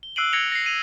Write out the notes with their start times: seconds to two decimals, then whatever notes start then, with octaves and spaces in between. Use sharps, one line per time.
0.03 G7
0.16 E6 F#6 C7 D7 D#7 F#7
0.33 G#6 A#6 C#7 F7 G7
0.52 A#6 C7
0.66 D#7 F7